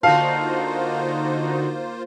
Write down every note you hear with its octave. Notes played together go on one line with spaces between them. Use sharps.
D3 A#3 D#4 F4 F#4 C5 F5 A5